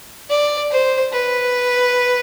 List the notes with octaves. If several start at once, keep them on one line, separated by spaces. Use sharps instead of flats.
D5
C5
B4